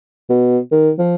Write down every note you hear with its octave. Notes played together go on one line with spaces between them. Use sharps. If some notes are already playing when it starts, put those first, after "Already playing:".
B2
D#3
F3